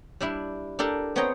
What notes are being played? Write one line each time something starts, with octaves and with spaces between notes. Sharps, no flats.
G3 D4 E4
D4 G4 A4 A#4
B3 C4 G#4 C#5 G5 A#5